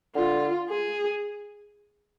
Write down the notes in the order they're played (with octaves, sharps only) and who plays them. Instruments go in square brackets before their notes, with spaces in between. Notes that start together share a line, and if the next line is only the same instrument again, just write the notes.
[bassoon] D3 [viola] F4
[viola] G#4